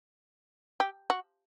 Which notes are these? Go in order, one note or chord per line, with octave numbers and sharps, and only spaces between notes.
G4
F#4